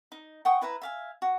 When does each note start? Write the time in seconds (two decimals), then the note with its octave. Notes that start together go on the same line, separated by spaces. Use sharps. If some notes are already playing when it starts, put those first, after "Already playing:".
0.12 D#4
0.45 F#5 G5 C#6 D#6
0.61 E4 B4 E5 A#5
0.82 E5 F5 G#5
1.22 F#4